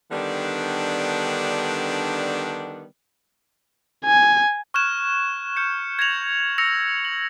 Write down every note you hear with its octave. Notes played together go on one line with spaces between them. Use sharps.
D3 D#3 G3 B3 D4
G#5
C#6 F6 F#6 G#6 E7
F6 G6 C#7
G#6 A#6 C#7 F7 F#7
E6 A#6 C#7 F7
F#7